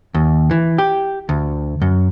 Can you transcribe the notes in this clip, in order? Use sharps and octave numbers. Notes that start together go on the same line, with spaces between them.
D#2
E3
G4
D2
F#2